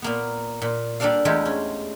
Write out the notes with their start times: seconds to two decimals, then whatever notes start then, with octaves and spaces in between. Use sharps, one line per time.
0.02 A#2 A#3 B3
0.62 A#2
1.00 G3 A#3 D4 A4 D5 F5
1.25 E2 G#3 A3 E4 F4 G4
1.45 C#4